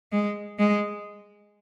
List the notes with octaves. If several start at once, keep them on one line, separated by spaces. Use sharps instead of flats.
G#3
G#3